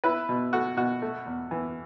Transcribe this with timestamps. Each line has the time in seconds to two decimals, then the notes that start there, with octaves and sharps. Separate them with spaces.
0.04 E4 B4
0.29 B2
0.53 A3 F#4
0.77 B2 F#4
1.02 A3
1.26 E2
1.51 E3